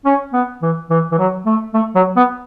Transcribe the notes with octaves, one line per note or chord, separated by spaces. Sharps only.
C#4
B3
E3
E3
E3
F#3
A3
A3
F#3
B3